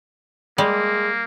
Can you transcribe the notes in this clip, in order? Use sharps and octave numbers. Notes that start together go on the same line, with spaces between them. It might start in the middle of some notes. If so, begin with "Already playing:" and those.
G3 G#3 A#3